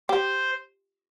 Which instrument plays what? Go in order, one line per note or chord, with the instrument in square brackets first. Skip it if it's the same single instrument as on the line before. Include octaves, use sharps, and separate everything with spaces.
[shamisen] G4 [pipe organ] C5